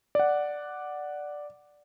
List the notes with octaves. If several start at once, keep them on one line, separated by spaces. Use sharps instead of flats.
D5 F#5